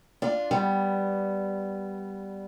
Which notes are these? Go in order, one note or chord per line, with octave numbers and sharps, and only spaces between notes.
D4 F4
G3 B3